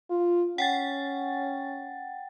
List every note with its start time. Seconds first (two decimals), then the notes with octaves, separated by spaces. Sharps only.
0.10 F4
0.58 C#4 F#5 G5 A6